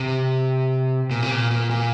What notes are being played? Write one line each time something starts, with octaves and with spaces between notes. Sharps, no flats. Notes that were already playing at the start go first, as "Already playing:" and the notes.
Already playing: C3
A#2
C3
A#2
A#2
A#2